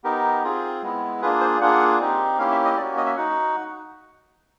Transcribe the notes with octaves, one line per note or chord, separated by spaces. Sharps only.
B3 D#4 G4 A#4
C4 F4 G#4
G#3 B3 E4
A#3 D4 F4 G#4 B4
C5
A#3 D4 F4 G#4 F#5
C4 D#4 G4
A#3 C#4 E4 G4 F5
E5
D#5
A#3 C#4 F#4 D5
D#5
E5
D#4 F#4 F#5